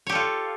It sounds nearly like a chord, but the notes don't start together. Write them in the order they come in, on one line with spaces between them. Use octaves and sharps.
C#5 G4 A4 F4